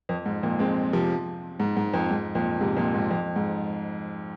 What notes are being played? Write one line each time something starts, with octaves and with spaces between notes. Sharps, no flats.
F2
G#2
F2 A#2
G#3 C4
C3 F3
G#2
G#2
F2
G#2
F2 A#2
G#2 C3
F2 A#2
G#2
F2
G#2